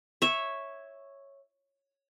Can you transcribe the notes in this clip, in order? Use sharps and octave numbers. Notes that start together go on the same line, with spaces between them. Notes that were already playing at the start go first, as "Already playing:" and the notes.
C#5 E5